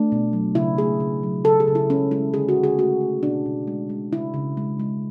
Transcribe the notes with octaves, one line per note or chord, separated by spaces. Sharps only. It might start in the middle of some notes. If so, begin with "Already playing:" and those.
Already playing: A3 D4
B2
F#3
C#3 E4
A3 G#4
C#3
F#3
C#3 A4
G#4
C#3
E4
G#3 C#4
G#3 E4
D3 G#4
F#4
D3
G#4
A3 F#4
A3
B2 D4
B2
G#3
G#3
C#3 E4
C#3
G#3
G#3